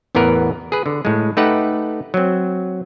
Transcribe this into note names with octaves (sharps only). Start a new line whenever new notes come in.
A1 E2 E3 B3 A#4 B4
G#4 B4
D3
A2 G#3
A3 D#4 G4 B4 F#5
F#3 C4